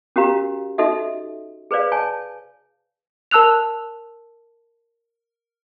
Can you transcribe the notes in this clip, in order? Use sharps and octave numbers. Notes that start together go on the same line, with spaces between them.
C#4 F#4 G4 A#4 F5 A#5
D#4 F#4 A4 D#5 E5
G#4 B4 C5 D5 F5
C#5 G#5 A5
A#4 A5 E6 F#6 F7